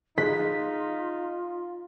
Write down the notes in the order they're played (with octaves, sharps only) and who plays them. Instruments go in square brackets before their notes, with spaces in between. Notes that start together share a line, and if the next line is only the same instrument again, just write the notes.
[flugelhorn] D#4 [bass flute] F4 [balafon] G#4 [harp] B6